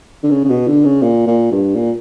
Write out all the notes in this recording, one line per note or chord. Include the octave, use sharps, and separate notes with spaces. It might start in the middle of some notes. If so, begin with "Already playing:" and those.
D3
C#3
C#3
B2
D3
C#3
A#2
A#2
G2
A#2